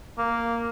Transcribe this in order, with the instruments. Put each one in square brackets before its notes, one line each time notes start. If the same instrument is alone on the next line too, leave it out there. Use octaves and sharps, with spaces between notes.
[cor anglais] A#3